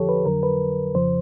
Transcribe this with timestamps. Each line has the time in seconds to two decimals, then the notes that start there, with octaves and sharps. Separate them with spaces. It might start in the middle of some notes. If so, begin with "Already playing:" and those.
Already playing: F2 D3 F3 G4 A4 C#5
0.09 B4
0.26 F2 D3 F#3 A#4
0.43 B4
0.95 F2 C#3 F3 C5